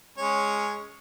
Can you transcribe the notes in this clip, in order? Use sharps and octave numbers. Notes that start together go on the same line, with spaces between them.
G#3 C#4 C#5